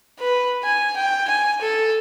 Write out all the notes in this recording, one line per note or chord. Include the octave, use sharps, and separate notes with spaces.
B4
G#5
G5
G#5
A4